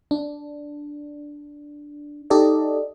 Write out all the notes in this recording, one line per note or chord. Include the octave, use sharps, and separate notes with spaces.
D4
D#4 G4 A4 D5 D#5